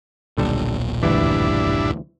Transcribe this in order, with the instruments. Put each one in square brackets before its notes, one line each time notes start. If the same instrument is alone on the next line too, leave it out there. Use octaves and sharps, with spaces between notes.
[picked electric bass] D#1 B1 A#2 [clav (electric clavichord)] D3 G3 A4
[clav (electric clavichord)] D2 E3 [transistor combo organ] G2 D4 E4